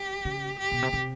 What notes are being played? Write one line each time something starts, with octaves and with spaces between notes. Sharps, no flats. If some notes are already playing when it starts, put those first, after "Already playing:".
Already playing: G4
C#3
G4
B2
C3
C3